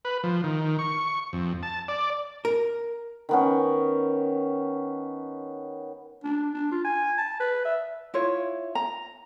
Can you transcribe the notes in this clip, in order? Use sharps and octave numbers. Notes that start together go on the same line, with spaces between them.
B4
F3
D#3
C#6
F2
A5
D5
A#4
D#3 B3 C#4
D4
D4
F4
G#5
A5
B4
E5
E4 F4 C#5
A#5